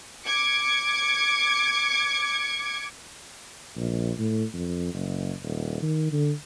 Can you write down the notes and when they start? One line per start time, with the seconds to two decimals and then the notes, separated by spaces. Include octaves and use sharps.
0.24 D6 G#6 C#7
3.76 A#1
4.19 A2
4.54 F2
4.94 F#1
5.42 D#1
5.82 D#3
6.12 D3